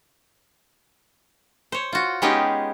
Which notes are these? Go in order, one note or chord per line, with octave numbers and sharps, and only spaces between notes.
C5 C#5
F4 F#4
G#3 B3 C#4 D#4 G4 G#4